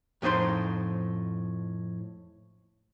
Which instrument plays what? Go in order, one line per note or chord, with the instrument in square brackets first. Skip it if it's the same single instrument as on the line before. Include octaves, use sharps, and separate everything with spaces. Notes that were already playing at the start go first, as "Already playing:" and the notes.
[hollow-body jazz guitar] F2 A2 D#4 C5 C6